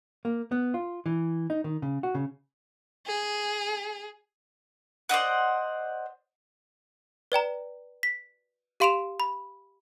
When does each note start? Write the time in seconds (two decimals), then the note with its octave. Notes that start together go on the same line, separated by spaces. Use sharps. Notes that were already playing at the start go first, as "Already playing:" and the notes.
0.25 A#3
0.52 B3
0.74 F4
1.06 E3
1.50 D#4
1.64 D#3
1.82 C#3
2.03 F#4
2.15 C#3
3.06 G#4
5.09 C5 D5 D#5 F#5
7.32 B4 D5 G5 A#5
8.03 B6
8.80 G4 F5 C6 D7 E7 F7
9.20 B5